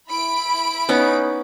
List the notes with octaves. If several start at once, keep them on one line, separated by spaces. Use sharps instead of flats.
E4 B5 D7
B3 C#4 D#4